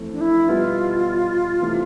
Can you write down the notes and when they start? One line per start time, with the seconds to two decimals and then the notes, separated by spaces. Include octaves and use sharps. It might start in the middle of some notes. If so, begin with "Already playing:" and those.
Already playing: F2 E3 A3 C4
0.13 D4
0.21 E4
0.48 B2 G3 B3 F4
1.60 C3 E3 A3